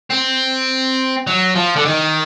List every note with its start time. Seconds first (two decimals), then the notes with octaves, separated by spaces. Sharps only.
0.10 C4
1.27 F#3
1.55 F3
1.76 D3
1.86 D#3